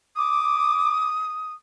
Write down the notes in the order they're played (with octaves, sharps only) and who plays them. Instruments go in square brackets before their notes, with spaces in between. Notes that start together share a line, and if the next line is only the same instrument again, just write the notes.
[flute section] D6 [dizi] D#6